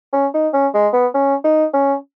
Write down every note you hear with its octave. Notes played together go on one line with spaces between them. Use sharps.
C#4
D#4
C#4
G#3
B3
C#4
D#4
C#4